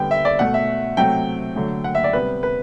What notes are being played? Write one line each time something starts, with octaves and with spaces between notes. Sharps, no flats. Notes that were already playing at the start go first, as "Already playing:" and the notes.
Already playing: D3 G3 B3 G5
E5
D5
B2 A3 F#5
E5
C3 F#3 A3 G5
D3 F#3 A3
F#5
E5
D5
C3 G3 B3 B4
B4